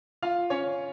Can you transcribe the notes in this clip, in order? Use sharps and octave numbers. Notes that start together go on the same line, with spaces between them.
F4 F5
C#4 C#5